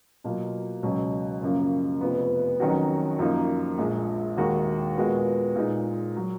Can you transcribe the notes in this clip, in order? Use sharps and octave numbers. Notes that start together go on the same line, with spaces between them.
B2 F#3 A#3 F4
C#2 B2 F#3 C#4
F#2 C#3 F3 A#3
F1 F2 F3 B3
F2 D#3 F#3 C#4 F#4
F#2 F3 A#3 D#4
A#1 A#2 G#3
D#2 D#3 G#3 D#4 F#4
A#2 G#3 B3 F#4 A#4
A#2 G#3 D#4
F#3